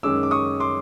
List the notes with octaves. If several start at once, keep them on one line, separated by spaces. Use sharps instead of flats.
F#2 D#3 G#3 C#4 D6 E6
D6
C#6 D#6
C6 D6